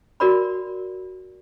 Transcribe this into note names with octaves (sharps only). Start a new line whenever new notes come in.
F#4 A#4 D5 B5